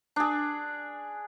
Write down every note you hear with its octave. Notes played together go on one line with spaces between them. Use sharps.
D4 G#4